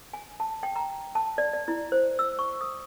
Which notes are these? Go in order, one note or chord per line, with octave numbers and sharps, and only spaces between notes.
G#5
A5
G5
A#5
A5
D5
D5
E4
C5
E6
C#6
D#6